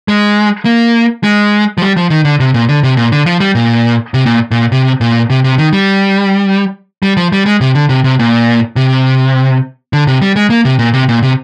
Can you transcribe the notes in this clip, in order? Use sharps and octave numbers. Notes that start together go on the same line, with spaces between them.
G#3
A#3
G#3
F3
G3
F3
D#3
D3
C3
A#2
D3
C3
A#2
D3
F3
G3
A#2
C3
A#2
A#2
C3
A#2
C3
C3
D#3
G3
G3
F3
G3
G#3
C3
D3
C3
C3
A#2
C3
D3
C3
G3
G#3
A#3
C3
A#2
C3
A#2
C3